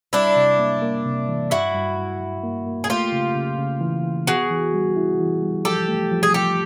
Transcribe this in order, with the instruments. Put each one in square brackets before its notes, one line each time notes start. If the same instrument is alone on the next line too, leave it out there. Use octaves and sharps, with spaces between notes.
[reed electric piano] G3 [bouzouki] D4 E4
[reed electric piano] C3
A#3
A#3
C3
E3
[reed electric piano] G2 [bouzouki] E4 F#4
[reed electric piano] G2
G2
G2
A#3
A#3
[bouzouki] G#4
[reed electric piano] A3 [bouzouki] F4 G4
[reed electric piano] C#3
C#3
C#3
E3
E3
[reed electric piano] B3 [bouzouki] F#4 G#4
[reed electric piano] E3
G3
E4
E3
G3
[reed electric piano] F3 [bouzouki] G4 A4
[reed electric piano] A3
F3
[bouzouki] G#4
[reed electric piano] F3 [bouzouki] G4 A4